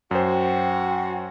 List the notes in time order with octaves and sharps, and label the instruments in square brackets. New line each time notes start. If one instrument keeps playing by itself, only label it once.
[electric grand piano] F#2 C5 [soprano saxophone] F#4 [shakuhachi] G5